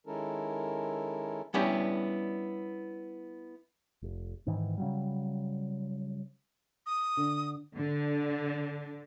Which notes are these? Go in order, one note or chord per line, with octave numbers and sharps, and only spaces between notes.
D#3 G#3 C#4 E4 A4 A#4
G3 B3 C#4 D4 E4 G4
F1
G#2 D#3 E3
C#3 F#3 G3
D#6
D3
D3